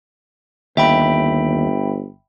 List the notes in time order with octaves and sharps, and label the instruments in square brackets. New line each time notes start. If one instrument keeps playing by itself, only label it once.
[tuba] G1 [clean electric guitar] D#2 [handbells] E5 G5 B5